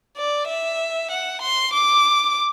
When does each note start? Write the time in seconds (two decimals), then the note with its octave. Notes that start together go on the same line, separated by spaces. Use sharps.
0.17 D5
0.48 E5
1.11 F#5
1.42 C6
1.73 D6